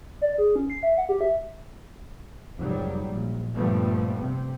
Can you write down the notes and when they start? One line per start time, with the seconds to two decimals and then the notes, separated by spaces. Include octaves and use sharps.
0.22 D5
0.38 G#4
0.56 C#4
0.70 C7
0.83 E5
0.98 F#5
1.09 G4
1.21 E5
2.58 F1 G#2 F#3 G3
3.08 A#1
3.54 G2 A#2 F3 G3 A3 B3
4.19 C3